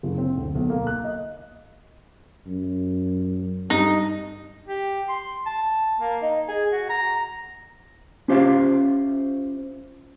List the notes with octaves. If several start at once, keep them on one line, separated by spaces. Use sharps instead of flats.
F#1
C4
D2
B1
A#3
F#6
D#5
F#2
G2 D#4
G4
C6
A5
A#3
D#4
G#4
F#4
A#5
C#4 F4 G4 C5 E5 F5